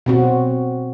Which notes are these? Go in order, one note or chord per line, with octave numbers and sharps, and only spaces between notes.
B2 C4 F#4